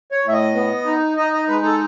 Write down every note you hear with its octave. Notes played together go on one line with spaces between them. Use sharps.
C#5
A2
E5
D#5
B3
D#4
D#4 D#5
D#5
G#3 B4
A4